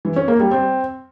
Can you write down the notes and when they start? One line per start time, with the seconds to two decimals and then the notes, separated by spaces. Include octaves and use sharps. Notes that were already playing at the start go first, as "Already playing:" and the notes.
0.05 E3
0.16 C#4
0.28 A#3
0.40 G3
0.51 C4